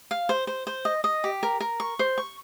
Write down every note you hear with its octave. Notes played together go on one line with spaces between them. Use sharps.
F5
C5
C5
C5
D#5
D#5
G4
A#4
A#4
C#6
C5
C#6